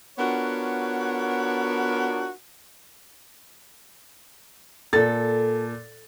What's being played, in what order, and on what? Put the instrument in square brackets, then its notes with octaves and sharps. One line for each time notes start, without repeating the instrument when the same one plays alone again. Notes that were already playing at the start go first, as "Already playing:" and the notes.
[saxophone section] B3 D4 F4 F#4 A#4 C#5
[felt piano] A#2 A6 [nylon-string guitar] A4